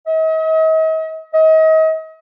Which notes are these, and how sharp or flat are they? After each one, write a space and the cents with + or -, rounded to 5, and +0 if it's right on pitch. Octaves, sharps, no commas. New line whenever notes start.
D#5 +45
D#5 +35